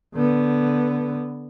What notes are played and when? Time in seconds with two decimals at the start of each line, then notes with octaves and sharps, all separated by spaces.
0.14 D3 B3